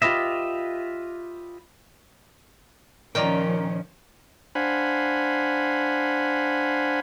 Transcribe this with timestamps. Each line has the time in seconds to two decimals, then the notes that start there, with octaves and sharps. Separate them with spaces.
0.02 F4 G4 B4 D#5 E5
3.15 A#2 D#3 F3 C#4 A#4 D5 G5 A#5
4.55 D4 C5 F5 F#5 G#5 B5